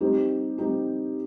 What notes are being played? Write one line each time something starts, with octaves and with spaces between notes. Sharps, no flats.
G3 C4 D#4 G4
G3 C4 D#4 G4